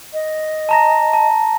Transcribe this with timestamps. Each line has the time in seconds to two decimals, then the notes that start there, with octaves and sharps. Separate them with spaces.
0.13 D#5
0.69 A5 A#5 A#6
1.13 A5